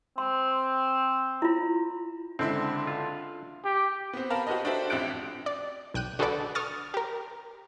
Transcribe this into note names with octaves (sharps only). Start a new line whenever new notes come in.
C4 C6
E4 F4
C#2 D3 C4 D4 E4 E5 C6
F4
G4
B3 C4
A#4 F5 A5 B5
F#4 G4 B4 C5 D#5
D4 F#4 G4 A4 C5 E5
A1 F2 G4 E5 F#6 D7
D5
B1 G5 F#6 D#7
D3 F#4 G#4 A4 B4 D5
C#6 D#6 F6 A6
G4 A#4